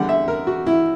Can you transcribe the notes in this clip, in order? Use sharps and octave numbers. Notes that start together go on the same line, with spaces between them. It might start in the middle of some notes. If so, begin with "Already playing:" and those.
Already playing: E2 D3 G3 F#5
E5
A#4
F#4
E4